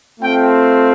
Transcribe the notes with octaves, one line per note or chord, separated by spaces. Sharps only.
A3 C4 F4 G5